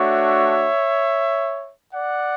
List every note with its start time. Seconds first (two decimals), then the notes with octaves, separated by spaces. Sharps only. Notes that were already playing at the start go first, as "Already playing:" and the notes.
Already playing: A3 D4 F#4 C#5 E5
1.94 D5 F#5